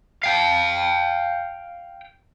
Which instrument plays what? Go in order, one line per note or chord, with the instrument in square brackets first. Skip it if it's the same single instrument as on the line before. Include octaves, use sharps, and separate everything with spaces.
[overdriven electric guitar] F5 G5